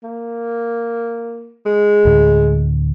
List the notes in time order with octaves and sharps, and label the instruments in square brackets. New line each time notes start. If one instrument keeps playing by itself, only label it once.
[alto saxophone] A#3
G#3
[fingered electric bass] D2 A2 D3